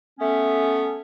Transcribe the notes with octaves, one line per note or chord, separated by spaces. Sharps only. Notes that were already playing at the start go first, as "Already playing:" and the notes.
A3 B3 C#4